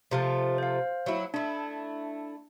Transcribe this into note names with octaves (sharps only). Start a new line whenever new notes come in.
C3 F3 A3
C5 F5
F#3 E4
A3 D4 E4